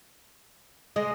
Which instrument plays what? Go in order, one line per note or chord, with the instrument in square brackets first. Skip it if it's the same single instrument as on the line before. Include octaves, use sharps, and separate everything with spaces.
[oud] G#3 [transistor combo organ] D#5